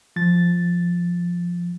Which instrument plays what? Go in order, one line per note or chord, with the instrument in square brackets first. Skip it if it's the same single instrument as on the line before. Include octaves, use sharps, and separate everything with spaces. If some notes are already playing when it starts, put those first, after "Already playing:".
[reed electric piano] F3 A6